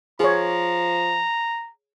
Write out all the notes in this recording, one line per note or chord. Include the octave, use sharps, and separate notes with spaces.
F3 G#4 C#5 A#5